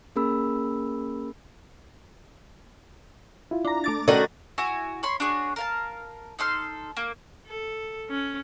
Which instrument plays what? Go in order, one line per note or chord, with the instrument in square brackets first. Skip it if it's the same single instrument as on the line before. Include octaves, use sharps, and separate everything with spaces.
[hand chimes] A#3 C#4 G#4 A#4 B5 E6
[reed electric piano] E4 F4
[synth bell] D4 A#5
A3 D6 A6
[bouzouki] D#3 F#4 [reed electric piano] C#4 [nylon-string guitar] A4 D5 D#5
[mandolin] E4 F#4 G#5
C#5 B5 C6
D4 F#4 G#4 C#5
A#4 F5 A5
D#4 A4 C6 F6
A#3
[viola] A4
C#4